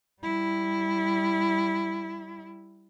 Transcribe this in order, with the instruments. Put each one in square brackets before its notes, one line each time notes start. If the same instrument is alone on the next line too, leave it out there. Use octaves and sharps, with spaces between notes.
[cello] G3 E4